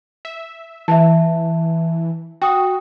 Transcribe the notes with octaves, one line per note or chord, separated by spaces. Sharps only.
E5
E3 E5 A5
F#4 G5 D#6